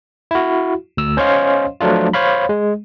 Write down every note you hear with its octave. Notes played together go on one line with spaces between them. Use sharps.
E4 F#4
D2 E6
C#4 C5 C#5 D#5 F5 C6
F3 F#3 A3 D4 F4
C5 C#5 F5 B5
G#3